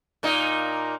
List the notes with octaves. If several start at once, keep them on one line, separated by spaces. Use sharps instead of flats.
A#2 A#3 D#4